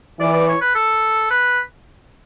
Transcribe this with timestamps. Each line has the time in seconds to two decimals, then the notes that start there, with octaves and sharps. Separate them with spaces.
0.20 E3 D5
0.34 D5
0.48 C#5
0.61 B4
0.75 A4
1.31 B4